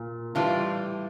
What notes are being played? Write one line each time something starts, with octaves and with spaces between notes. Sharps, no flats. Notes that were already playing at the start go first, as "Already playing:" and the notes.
Already playing: A#2
A2 E3 G3 F4